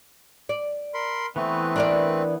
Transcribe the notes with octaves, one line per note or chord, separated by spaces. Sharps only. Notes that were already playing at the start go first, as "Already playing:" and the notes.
D5
A#4 B5 C6
E3 A3 B3 C4 B4 C#6
D4 A#4 D5